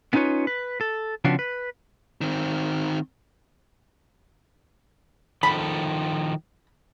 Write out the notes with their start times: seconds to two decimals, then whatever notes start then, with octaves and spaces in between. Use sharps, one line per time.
0.13 B3 C#4 D#4 F4 B4 C#5
0.47 B4
0.81 A4
1.25 C#3 F3 B3 C4 D4 F#4
1.39 B4
2.21 D#3 C4
5.43 D#3 F3 A4 B5